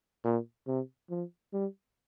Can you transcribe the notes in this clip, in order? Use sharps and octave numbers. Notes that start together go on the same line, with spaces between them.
A#2
C3
F3
G3